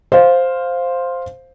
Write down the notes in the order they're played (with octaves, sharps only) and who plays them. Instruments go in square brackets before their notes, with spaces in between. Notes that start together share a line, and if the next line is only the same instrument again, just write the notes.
[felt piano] C5 F5